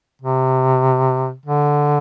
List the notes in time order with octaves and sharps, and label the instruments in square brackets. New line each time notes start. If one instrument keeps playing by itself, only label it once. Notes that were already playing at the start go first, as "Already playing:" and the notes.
[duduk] C3
D3